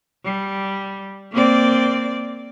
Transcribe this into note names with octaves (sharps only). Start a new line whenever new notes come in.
G3
A#3 C4 D5